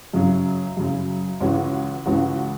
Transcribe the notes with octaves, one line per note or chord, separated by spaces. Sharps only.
F#2 C#3 F#3
F#2 C#3 F#3
C#2 C#3 E3 C#4 F#4
C#2 C#3 E3 C#4 F#4